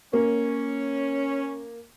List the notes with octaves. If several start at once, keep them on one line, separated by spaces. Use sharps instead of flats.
A#3 C#4